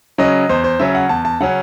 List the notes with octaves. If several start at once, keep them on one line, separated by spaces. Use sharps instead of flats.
C#3 F#3 C#4 D#5
E2 C5
C5
C#3 F#3 C#4 E5
F#5
E2 A5
A5
C#3 F#3 C#4 F#5